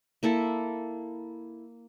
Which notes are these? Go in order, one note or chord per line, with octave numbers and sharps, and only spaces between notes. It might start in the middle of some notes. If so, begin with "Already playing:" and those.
A#3 E4 A4